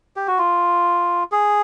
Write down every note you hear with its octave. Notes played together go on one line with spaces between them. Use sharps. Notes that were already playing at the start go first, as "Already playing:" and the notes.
G4
F#4
F4
G#4